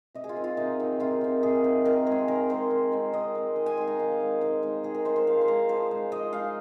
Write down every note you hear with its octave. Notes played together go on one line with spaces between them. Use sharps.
C3 D#5
G#4
F4
D#3 C4
F4
C3 D#4
D#3 C4
C3 F4
D#3 C4
C3 G#4
D#3 C4
D#3 A#4
G#3 G#4
C4
D#3 A#4
G#3 C4 C5
D#3
G#3 C4
D#3 D#5
G#3 C4
D#3
G#5
G#3 D#4 C6
A#5
D#3 F5
G#3 D#4
D#3 C5
G#3 D#4
D#3 G#4
A#4
G#3 D#4 C5
C5
F3 F5
C6
G#3 D#4 A#5
F3 C5
G#3 D#4
F3 D#5
G#3 D#4 F5